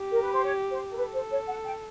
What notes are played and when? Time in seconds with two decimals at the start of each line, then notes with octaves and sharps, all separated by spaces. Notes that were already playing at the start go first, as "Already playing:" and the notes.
Already playing: G4
0.11 A#4
0.22 B4
0.34 C5
0.44 C#5
0.71 C5
0.91 A#4
0.96 A4 B4
1.14 C5
1.31 C#5
1.48 F#5
1.65 G5